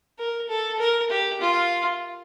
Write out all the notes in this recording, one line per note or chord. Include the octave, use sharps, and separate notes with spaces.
A#4
A4
A#4
G4
F4